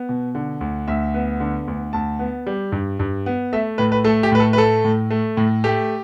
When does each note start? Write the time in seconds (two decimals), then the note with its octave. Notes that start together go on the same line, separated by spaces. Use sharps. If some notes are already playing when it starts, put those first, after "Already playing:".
Already playing: B3
0.09 B2
0.35 D3
0.61 D2
0.88 D2 E5
1.14 B3
1.40 D3
1.68 D2
1.93 D2 A5
2.19 B3
2.47 G3
2.72 G2
2.99 G2
3.26 B3
3.53 A3 E5
3.78 A2 B4
3.92 B4
4.04 A3 A4
4.23 G4
4.32 A2 B4
4.40 A4
4.53 B4
4.57 A3 A4
4.85 A2
5.11 A3
5.37 A2
5.64 A3 G4